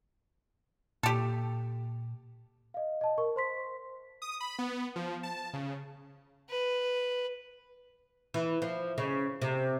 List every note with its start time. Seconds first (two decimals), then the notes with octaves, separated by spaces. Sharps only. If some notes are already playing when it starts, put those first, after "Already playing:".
1.03 A#2 G4 A4
2.74 D#5 F5
3.01 D#5 A5
3.18 A#4 C#6
3.36 C5 C6 B6
4.22 D#6
4.41 B5
4.59 B3
4.96 F3
5.23 A5
5.53 C#3
6.50 B4
8.34 E3
8.62 F3
8.98 C#3
9.42 C3